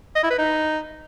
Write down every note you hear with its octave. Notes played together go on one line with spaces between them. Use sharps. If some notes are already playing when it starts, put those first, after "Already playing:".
D#5
E4
B4
D#4